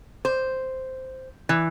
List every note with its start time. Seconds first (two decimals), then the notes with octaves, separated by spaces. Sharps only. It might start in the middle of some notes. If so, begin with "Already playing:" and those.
0.25 C5
1.49 E3